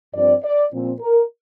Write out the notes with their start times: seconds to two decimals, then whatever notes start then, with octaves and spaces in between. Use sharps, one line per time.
0.13 G2 F3 C4 D5
0.43 D5
0.72 A#2 F3 C4
1.00 A#4